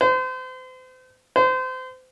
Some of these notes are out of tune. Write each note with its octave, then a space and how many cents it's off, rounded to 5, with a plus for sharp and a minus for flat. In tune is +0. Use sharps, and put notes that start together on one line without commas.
C5 -35
C5 -30